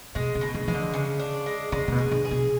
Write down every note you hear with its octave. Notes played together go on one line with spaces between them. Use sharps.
B2 G#3
C#3
B2
D3
E3 G#3
D3
C#3
D4
G#3
C#3 G#3
C#3
B2
G#4
D3
G#4
B2